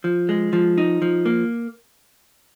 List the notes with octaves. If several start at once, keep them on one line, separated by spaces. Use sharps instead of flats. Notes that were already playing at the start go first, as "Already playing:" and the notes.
F3
G#3
F3
D#4
F3
A#3